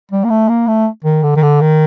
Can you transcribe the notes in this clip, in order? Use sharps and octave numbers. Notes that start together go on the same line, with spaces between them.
G3
A#3
A3
A#3
A3
D#3
D3
D#3
D3
D#3